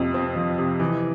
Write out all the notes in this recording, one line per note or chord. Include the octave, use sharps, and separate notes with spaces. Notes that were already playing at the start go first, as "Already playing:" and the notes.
Already playing: F2 C3 F3
C4
F3
C3
E3